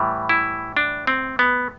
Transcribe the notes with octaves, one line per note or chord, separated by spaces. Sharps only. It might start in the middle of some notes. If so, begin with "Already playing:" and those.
Already playing: A2 E3 G3
E4
D4
C4
B3